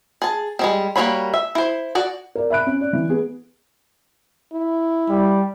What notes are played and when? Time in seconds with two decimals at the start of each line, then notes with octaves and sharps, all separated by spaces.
0.22 G#4 A5
0.59 G3 G#3 C4
0.96 G3 A#3 F#4 C#5 B5
1.34 E5
1.55 E4 C5
1.95 F#4 D5
2.35 A#4 D5
2.50 E5 B5 F#6 D7
2.66 C#4
2.81 D5
2.93 E3
3.09 B3 G#4
4.53 E4
5.10 G3